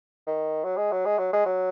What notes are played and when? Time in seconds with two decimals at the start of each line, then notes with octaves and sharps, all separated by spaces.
0.27 D#3
0.64 F#3
0.77 G#3
0.92 F#3
1.05 G#3
1.18 F#3
1.33 G#3
1.46 F#3